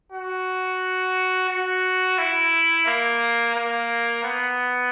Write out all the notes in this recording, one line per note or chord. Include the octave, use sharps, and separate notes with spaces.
F#4
F#4
E4
A#3
A#3
B3